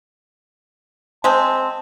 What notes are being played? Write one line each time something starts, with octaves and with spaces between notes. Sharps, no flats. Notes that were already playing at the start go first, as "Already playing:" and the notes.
G#3 C4 A5